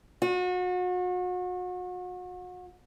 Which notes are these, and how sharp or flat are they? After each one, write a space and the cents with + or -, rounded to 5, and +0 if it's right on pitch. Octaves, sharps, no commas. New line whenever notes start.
F#4 -35